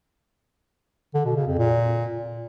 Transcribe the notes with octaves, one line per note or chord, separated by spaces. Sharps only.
D3
B2
C#3
F2
A#2